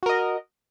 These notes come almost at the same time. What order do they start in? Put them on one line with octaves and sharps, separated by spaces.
F#4 A#4 D#5